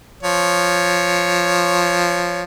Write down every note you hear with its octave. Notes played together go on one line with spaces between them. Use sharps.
F3 C#5